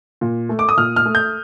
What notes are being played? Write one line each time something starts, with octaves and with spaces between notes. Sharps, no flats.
A#2
A3
D6
D#6
A#2 F6
F6
A3
G6